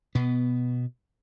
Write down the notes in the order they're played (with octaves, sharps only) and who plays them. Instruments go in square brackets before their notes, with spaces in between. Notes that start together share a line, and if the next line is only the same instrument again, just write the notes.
[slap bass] B2 B3